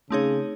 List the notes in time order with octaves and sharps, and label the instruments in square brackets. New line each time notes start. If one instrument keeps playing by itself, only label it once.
[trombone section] C#3 [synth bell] A3 C4 D#4 G#4 C#5